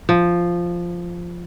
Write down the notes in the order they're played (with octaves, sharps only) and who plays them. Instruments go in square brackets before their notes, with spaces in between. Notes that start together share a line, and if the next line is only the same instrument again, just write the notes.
[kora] F3